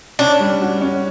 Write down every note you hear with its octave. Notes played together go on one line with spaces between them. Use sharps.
C#4 D4
G3
F#4
C#4